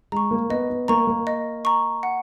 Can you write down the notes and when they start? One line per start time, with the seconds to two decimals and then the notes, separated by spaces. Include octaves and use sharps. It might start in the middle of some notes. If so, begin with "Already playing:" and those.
0.12 G#3 A#5 C#6
0.31 A#3
0.50 B3 D#5
0.70 B3
0.88 A#3 A#5 C#6
1.07 A#3
1.27 D#5
1.65 A#5 C#6
2.03 F#5